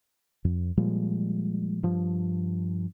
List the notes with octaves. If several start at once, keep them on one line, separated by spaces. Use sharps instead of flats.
F2
A#2 F3 G3 G#3
G2 F3